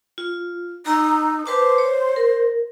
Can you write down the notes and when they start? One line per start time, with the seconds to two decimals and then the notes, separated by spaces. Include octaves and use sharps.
0.18 F4
0.86 D#4 A#5 E6
1.46 B4 C5 A5 D6
1.78 C#5
2.16 A#4